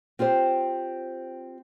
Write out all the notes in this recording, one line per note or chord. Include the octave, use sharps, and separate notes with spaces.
C4 F4 G4 C5